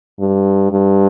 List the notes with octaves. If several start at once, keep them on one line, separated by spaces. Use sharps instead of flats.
G2
G2